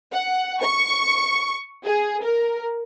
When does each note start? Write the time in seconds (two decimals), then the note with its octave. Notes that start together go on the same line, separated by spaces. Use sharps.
0.13 F#5
0.62 C#6
1.85 G#4
2.24 A#4